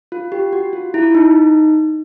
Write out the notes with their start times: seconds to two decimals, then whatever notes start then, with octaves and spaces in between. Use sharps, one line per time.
0.12 F4
0.32 G4
0.53 F#4
0.73 F4
0.94 E4
1.15 D#4